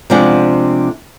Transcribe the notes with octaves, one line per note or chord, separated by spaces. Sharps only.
C3 F3 G#3 D4 F#5